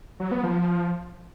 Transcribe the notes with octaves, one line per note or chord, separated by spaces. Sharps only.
F#3
B3
F3